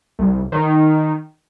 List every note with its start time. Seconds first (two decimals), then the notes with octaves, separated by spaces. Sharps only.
0.19 C2
0.52 D#3